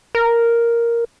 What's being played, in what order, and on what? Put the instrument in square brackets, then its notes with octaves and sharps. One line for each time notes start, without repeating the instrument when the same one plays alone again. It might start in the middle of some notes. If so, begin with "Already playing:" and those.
[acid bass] A#4